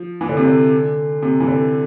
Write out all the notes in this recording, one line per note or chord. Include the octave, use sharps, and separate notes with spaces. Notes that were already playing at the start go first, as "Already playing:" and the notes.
Already playing: F3
E3
D3
C3
D3
C3
E3
D3